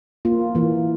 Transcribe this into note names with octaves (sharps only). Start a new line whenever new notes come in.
A#3 F4
E3 A#3